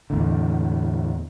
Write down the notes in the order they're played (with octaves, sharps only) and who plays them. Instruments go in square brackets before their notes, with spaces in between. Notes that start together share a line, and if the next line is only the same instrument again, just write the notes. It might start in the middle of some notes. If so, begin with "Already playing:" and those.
[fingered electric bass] E2 A2 D3